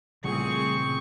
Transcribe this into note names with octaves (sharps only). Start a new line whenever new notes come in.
A#2 C#3 E3 G3 A3 C4 G#4 C#6